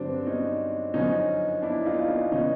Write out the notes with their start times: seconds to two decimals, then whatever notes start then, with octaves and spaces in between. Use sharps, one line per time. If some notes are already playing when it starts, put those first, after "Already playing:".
Already playing: G2 D3 F#3 C4 D4
0.27 C#4 D#4
0.94 F#2 D3 F3 C#4 D#4
1.62 D4 E4
1.86 D#4 F4
2.08 D#4 F4
2.31 C#3 E3 C#4 D#4